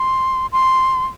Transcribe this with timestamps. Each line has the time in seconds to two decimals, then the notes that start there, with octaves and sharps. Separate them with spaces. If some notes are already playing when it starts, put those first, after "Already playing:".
Already playing: C6
0.52 C6